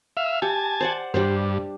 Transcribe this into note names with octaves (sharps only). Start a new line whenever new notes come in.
E5 F5
G4 G#5 A5
C5 D5 F#5
G2 G3 D4 C5